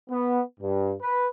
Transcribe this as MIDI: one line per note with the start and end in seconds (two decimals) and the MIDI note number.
0.10 0.41 59
0.60 0.94 43
1.00 1.27 71